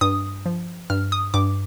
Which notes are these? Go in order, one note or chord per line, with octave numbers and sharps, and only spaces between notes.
G2 D#6
F3
G2 F6
D#6
G2 D6